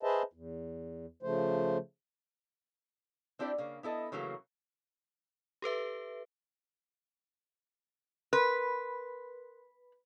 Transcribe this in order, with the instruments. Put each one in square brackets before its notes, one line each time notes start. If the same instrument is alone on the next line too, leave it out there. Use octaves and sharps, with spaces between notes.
[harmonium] G#4 B4 C5 D#5 E5 A5
E2
C#3 F3 A3 C5
[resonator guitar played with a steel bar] C4 D4 E4 G4 D5
C#3 A#3
B3 E4 A4 D#5 A5
C#3 E3 F#3 A3 A#3
[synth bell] G4 A4 B4 E5
[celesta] A#4 C6 F#6 [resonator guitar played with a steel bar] B4